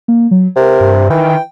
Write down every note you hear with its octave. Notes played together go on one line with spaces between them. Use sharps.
A#3
F#3
C3 A#4
G2
D#3 E3 G5
G5